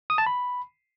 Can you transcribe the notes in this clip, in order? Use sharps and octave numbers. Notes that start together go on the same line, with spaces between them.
D#6
A5
B5